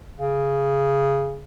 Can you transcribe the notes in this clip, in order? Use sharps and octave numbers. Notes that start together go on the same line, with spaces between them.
C#3